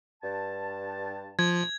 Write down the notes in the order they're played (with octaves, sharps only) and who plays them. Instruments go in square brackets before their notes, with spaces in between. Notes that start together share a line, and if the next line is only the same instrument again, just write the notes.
[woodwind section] G2 A5
[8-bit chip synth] F3 [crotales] G#6